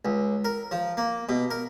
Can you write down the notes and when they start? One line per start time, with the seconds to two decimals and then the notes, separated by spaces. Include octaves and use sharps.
0.05 C#2
0.44 A#4
0.71 F3
0.97 A#3
1.29 B2
1.50 A#4